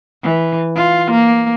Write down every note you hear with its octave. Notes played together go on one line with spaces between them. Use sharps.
E3
F4
A#3